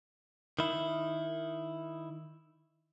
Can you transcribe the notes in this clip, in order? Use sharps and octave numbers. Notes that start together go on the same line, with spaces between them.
D#3 E4